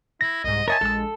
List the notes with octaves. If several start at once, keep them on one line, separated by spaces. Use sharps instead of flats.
E4 A#6
C2 G#2 D#5
A#4 C#5 D#5 E5 G#5 A5 C6
A#1 G#3 A4 E6